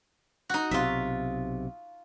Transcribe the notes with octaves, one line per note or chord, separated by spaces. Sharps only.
D#4 F#4
B1 C3 F4 E5